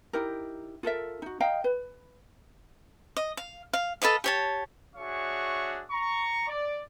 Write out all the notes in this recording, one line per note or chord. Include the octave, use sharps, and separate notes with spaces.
D#4 E4 G4 A#4
F4 A4 A#4 E5
D#4 F#4
D#5 F5 G5 A#5
B4
D#5
F5
F5
A4 B4 D#5 F5
G4 C#5 A5
D4 F#4 G#4 C#5 E5 C#6
A#5 C#6
D5